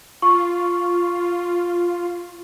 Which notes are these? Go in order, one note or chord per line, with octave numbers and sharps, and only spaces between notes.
F4 C#6